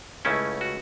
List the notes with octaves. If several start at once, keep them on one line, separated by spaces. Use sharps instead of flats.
C#2 C#3 A3 C#4 E4
F#4